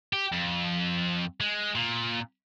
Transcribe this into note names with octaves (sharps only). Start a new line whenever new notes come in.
G4
F2
G#3
A#2